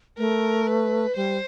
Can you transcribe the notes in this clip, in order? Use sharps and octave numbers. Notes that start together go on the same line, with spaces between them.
A3 A#4
B4
G3 C5